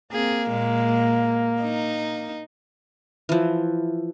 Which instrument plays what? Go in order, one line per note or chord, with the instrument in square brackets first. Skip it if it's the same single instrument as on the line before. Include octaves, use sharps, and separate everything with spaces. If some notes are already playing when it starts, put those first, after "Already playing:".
[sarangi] A#3 [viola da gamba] C4 G#4
[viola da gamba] A#2 G#3
D#4
[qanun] E3 F3